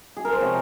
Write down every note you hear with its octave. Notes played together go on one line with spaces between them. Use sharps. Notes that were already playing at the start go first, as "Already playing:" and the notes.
G#4
A#4
C5
C3 F3 G#3 C#5